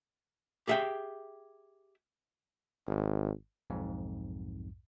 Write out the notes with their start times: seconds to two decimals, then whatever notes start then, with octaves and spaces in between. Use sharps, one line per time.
0.67 G4 G#4 E5 F5 G5
2.87 G#1
3.70 B1 F2 G#2